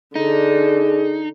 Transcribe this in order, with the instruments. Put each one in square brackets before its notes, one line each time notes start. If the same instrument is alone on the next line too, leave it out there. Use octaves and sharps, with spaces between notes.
[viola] D3 D4 [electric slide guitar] D#4 [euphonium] G#4